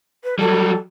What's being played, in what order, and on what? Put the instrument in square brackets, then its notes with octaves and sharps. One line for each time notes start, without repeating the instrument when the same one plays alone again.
[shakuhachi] B4
[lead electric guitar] F#3 G3 [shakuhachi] A4